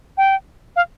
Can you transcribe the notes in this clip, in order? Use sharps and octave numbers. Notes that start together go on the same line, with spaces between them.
G5
F5